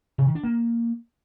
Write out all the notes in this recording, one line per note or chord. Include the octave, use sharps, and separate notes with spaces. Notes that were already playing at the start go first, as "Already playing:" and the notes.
C3
D#3
D4
A#3